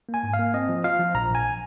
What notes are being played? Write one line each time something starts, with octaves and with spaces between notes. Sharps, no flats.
A#3
G#5
G#2
F5
A#3
C4 D#5
F3
F4 F5
F3
A#1 A#5
A#1 G#5